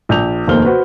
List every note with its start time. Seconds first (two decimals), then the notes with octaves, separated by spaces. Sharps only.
0.09 A#1 G6 F7
0.47 F1 D#2 A#3 C5 F6 G7
0.65 F#4 B4 C5